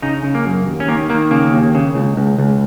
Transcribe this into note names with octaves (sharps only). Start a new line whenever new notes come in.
C#3 D#4
C#3
A#3
F#2
D#2
C#4
D#3 A#3
D#3 A#3
C#3 A#3
D#2
C#3
C#2
C#2
C#2